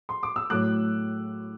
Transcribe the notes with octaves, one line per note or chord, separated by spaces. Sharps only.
C6
D6
E6
A2 F#3 A3 D6 F#6